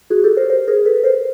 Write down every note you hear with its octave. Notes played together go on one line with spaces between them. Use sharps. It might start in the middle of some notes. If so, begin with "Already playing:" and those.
F#4 G#4
G4 A4
A#4 C5
A#4 C5
G#4 A#4
A4 B4
A#4 C5